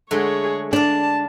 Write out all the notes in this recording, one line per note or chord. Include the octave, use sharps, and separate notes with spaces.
D3 G#3 A3 G#4 C#5
D4 D5 F5 A5